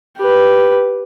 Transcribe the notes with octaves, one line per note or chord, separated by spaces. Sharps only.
G4 B4